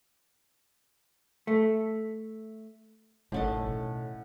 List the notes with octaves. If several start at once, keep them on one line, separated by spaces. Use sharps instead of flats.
A3
A1 A2 D#3 C#4 A4 D#5 F#5
B1